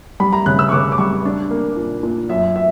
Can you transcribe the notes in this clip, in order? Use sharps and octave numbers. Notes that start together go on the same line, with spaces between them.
G3 B5
A#5
C#3 F#6
E6
C#6
C#3 D6
D6
G3 C#6
D4
A#3
A#2
A#2
F#2 E5
E5